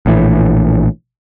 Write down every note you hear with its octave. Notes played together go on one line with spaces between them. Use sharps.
A#1 A2 E3